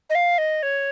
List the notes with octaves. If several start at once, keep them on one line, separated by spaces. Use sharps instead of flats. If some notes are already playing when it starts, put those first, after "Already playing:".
D#5
F5
D#5
C#5